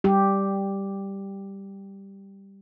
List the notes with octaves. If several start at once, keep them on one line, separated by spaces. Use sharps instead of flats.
G3 G4